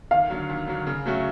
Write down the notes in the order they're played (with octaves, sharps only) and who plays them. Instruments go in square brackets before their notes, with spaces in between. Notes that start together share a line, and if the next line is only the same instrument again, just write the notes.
[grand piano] D#2 [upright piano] F5
[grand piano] D3 F#3
D#2
D3 F#3
C#3
F#3 A3 C#4 F#4